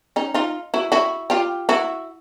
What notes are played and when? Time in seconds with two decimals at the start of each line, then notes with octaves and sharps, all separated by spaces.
0.16 C#4 D#4
0.34 D#4 F4
0.74 E4 F#4
0.92 E4 F#4
1.30 F4 G4
1.69 E4 F#4